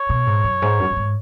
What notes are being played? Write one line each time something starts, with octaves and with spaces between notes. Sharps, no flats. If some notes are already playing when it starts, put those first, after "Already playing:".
Already playing: C#5
B2
G#2
F#2
G#2
F#2
F#2
G#2